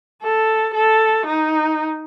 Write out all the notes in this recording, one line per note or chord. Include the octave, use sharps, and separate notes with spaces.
A4
A4
D#4